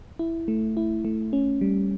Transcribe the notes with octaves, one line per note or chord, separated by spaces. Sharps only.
E4
A3
E4
A3
C#4
G3